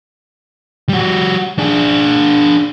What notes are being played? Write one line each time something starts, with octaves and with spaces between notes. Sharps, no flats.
G3 F#4
D4 G#4